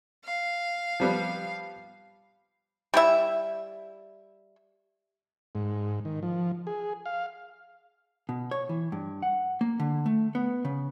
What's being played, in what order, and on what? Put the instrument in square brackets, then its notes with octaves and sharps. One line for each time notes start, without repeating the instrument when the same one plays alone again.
[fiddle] F5
[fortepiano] F3 G3 B3
[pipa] G3 E4 E5
[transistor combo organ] G#2
D#3
F3
G#4
F5
[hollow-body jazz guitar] B2
C#5
E3
G2
F#5
A#3
D3
A3
B3
C#3